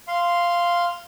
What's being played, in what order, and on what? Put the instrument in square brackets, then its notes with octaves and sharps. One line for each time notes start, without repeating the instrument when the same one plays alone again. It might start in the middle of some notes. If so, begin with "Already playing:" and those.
[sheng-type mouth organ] F5 C6